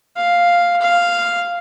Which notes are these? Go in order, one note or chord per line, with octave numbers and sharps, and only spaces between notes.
F5
F5